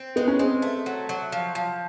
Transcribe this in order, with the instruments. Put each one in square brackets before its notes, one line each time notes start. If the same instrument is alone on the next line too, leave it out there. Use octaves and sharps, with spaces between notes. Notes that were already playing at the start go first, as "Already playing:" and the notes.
Already playing: [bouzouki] C4
[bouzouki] G#3 [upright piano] B3
[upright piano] C#4
[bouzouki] G#3 [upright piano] C4
[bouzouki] A3
F#3
F#3
F3
F3